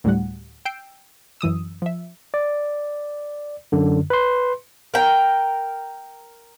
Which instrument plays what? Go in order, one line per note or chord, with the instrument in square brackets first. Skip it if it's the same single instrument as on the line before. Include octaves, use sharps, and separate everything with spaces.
[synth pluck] D2 A2 G3 F#5
G5 E6 G6 C7 D7
F#2 E3 D#6 E6
F3 E5
[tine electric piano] D5
F#2 D3
B4 C6
[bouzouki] A#4 G5